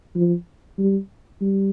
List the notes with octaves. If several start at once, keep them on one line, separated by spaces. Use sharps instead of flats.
F3
G3
G3